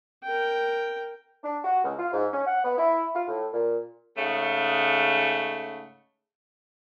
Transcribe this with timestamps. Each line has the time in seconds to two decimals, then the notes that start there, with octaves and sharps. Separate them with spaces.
0.24 A#4 G5
1.44 D4
1.65 F#4
1.85 C#2
1.99 F4
2.14 G#2
2.33 C#4
2.47 F#5
2.65 B3
2.78 E4
3.16 F4
3.28 A2
3.54 A#2
4.16 G#2 C#3 A3